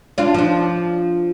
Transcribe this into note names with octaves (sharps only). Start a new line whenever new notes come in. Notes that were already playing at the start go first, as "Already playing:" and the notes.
D4 F4
F3 D4